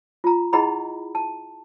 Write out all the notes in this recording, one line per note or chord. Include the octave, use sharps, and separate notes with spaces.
F4 A#5
E4 G#4 D#5 F#5 A#5 B5
A5